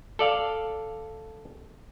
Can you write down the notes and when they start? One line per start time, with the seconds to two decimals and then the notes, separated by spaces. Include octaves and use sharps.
0.19 A4 D5 F5